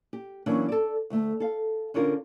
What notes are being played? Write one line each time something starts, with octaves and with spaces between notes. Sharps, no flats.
G4
E3 F#3 A#3 C#4 D4
A4 D5
D2 A3
A4 F5
D3 C#4 D4 F4 A#4